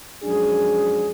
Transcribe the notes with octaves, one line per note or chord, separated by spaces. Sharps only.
F#2 F3 G#3 D4 G#4